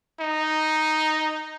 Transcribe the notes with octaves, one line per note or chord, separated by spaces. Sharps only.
D#4